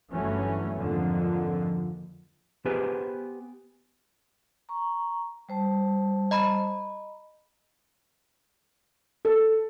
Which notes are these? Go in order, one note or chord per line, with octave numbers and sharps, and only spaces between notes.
G1 G2 E3 F#3 A3 C#4
F2 G#2 D3 F3 A#3
B3 G4 G#4 B4 C5
A#5 C#6
G3 C5 A5
D#5 A#5 B5
A4